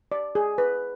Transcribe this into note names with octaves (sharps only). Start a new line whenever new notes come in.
D5
G#4
B4